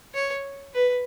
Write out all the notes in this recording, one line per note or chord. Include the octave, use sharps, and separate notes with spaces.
C#5
B4